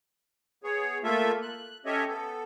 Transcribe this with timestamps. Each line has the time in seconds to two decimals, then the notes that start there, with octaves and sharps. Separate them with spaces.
0.64 B3 G#4 C#5
1.04 A3 A#3 F4 A4 E5
1.42 F#6
1.85 C#4 G4 A4 C#5 D#5 E5
2.08 B3 A4